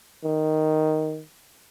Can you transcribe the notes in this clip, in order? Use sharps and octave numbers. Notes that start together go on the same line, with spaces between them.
D#3